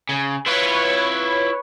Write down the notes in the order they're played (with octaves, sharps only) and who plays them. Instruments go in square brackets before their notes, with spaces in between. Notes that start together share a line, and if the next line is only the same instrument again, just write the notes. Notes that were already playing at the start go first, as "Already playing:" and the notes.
[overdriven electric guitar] C#3
[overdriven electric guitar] E4 F4 [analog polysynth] B4 C#5